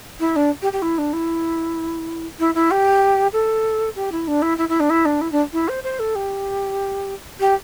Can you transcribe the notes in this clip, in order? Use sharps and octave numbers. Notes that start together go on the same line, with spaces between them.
E4
D4
G4
G4
E4
D4
E4
E4
E4
G4
A4
G4
E4
D4
E4
E4
E4
D4
E4
D4
E4
D4
E4
C5
C5
A4
G4
G4